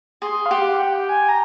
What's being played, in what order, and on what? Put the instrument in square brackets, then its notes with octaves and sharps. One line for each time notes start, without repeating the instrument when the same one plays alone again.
[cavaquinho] G#4 [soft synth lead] C6
[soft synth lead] F5
[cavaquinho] G4 [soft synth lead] F#5
[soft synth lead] G5
G#5
A#5